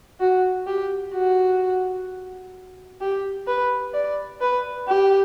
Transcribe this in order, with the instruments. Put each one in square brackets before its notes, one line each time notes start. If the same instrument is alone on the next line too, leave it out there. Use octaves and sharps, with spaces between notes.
[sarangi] F#4
G4
F#4
G4
B4
D5
B4
G4